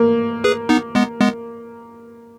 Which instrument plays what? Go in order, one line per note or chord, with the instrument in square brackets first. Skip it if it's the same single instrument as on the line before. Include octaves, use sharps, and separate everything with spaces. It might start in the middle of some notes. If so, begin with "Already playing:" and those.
Already playing: [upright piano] A#3
[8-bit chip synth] G#4 B4
B3 D#4
G#3 B3
G#3 B3